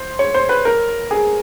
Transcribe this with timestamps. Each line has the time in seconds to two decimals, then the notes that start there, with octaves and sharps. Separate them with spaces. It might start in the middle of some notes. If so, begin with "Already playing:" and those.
Already playing: C5
0.19 C#5
0.34 C5
0.49 B4
0.65 A#4
1.11 G#4